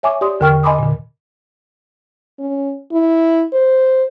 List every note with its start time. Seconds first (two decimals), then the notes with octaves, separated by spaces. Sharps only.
0.03 C#5 E5 G#5 C#6 D6
0.21 G4 D5 C6 D#6
0.40 E2 D3 A#4 G5 C#6 F6
0.63 D#5 G#5 B5 C6 D6 D#6
0.79 A#2 D3
2.39 C#4
2.92 E4
3.53 C5